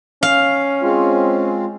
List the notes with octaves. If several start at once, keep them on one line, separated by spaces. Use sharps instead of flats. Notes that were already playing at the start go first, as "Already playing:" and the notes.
C#4 F5
G#3 C4 F4